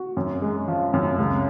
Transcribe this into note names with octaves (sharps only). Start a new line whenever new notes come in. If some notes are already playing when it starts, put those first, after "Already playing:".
Already playing: F#4
F#2
G#3
F3
F#2
C#2